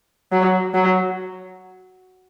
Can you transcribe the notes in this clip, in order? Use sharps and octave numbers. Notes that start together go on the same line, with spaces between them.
F#3
F#3